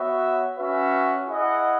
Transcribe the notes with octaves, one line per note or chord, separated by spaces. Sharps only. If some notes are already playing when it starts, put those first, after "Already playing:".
Already playing: B3 F#4 C#5 E5
C#4 F#4 B4 E5
E4 G#4 D#5 F#5